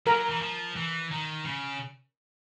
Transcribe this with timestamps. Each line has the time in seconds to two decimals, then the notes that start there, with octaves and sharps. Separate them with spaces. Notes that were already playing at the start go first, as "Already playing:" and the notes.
0.07 F#3 A#4
0.30 E3
0.41 F3
0.76 E3
1.11 D#3
1.45 C#3